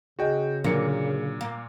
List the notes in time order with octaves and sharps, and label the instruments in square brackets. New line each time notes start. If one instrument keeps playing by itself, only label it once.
[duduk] C#3 [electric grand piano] F#4 G5 [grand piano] G#4 D#5
[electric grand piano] A#2 C#7 [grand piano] D3 F#3 [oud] A#3
[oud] A#3